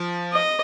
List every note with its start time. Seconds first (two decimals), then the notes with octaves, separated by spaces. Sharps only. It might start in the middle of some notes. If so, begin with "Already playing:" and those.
Already playing: F3
0.33 D#5